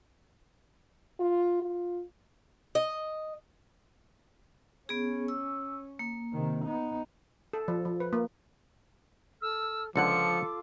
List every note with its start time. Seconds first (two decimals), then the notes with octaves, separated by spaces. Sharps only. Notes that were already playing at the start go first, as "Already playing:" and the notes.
1.19 F4
1.62 F4
2.75 D#5
4.89 B3 C#4 G#4
5.28 E6
5.99 A#3
6.33 C3 D#3
6.65 B3 D#4
7.53 A4
7.68 F3
7.85 F3
8.00 B4
8.13 A#3
9.42 A4 E6 F6
9.96 C#2 D3 F3 F4 A4 F#5 D6 C#7